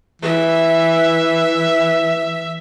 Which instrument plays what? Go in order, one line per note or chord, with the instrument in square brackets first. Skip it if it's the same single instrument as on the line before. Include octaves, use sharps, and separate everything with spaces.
[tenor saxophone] E3 [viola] E5